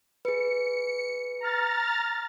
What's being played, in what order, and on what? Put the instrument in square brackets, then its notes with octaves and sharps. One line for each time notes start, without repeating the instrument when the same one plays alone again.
[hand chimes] G#4 B4 [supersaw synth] C#7
[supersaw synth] A#5 F6 A6